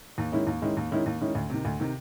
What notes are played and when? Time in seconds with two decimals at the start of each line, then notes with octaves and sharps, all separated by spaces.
0.18 D#2
0.32 D#3 G#3 C#4 E4
0.47 D#2
0.62 D#3 G#3 C#4 E4
0.77 D#2
0.91 D#3 G#3 C#4 E4
1.06 D#2
1.21 D#3 G#3 C#4 E4
1.35 D2
1.50 C3 D#3
1.65 D2
1.80 C3 D#3